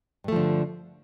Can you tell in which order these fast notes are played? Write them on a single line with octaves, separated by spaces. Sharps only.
G2 A3 F3 D3